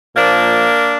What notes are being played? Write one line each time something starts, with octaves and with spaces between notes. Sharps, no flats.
A#2 F3 A#3 D4